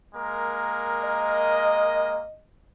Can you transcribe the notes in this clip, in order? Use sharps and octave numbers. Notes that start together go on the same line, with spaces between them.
G#3 A#3 A#4
D#5